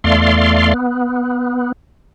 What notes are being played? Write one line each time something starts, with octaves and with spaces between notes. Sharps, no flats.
E2 A3 D5 F5 C6
B3